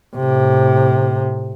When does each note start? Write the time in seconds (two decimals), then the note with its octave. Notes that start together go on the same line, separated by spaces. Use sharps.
0.17 A2 C3